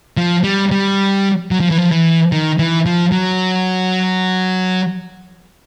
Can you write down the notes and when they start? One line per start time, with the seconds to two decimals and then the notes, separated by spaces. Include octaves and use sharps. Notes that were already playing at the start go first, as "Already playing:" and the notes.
0.17 F3
0.44 G3
0.71 G3
1.51 F#3
1.60 F3
1.70 E3
1.78 F3
1.91 E3
2.32 D#3
2.59 E3
2.86 F3
3.12 F#3